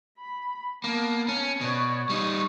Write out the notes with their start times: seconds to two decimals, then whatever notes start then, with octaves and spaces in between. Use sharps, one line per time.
0.18 B5
0.84 A#3 B3 A5
1.28 C#4
1.61 B2 C#5 D5
2.09 G3 D#4 C#6